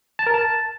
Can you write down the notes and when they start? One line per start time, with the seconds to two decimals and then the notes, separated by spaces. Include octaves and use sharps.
0.19 A5
0.27 A#4
0.34 A5